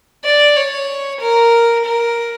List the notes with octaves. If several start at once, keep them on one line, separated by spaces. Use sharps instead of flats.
D5
C#5
A#4
A#4